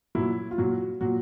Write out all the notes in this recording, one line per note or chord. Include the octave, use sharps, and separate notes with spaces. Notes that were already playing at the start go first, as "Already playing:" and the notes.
A#2 F#3 E4
F4
A#2 F#3 F#4
A#2 F#3 F#4